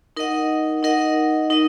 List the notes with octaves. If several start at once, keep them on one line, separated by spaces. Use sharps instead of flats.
D#4 A#4 D#5 F#5
D#4 A#4 D#5 F#5
D#4 A#4 D#5